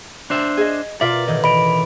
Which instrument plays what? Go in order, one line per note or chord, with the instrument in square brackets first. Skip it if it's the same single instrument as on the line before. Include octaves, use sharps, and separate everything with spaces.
[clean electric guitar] D4 C5 E5
[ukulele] G#4 D#5
[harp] B2 A#4 [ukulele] F4 E5 [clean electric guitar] D5
[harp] A1 D#3 E3 [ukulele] D#5
[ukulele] D#5 [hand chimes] B5 D7